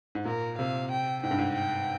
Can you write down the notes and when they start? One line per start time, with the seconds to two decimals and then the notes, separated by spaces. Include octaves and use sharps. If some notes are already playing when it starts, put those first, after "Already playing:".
0.15 G#2
0.25 A#2 A#4
0.58 C3 F5
0.91 G5
1.23 G#2 G5
1.31 G2
1.38 G#2
1.56 G5